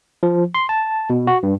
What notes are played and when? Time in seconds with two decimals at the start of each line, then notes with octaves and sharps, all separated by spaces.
0.23 F3
0.55 C6
0.69 A5
1.10 B2
1.27 F#4
1.43 G2